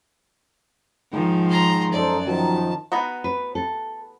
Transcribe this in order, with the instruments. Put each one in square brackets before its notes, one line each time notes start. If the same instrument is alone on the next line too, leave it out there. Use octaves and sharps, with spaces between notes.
[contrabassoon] G#2 [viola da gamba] D#3 F3
[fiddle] A#5 C6
[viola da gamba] F#2 [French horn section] D#4 A4 C5 [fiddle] D5
[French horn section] D#3 F3 [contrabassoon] F#3 [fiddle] A5
[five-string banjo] B3 D#4 F#4
[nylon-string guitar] B4
A4